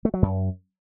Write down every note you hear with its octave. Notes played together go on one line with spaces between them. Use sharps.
A3
F#3
F#2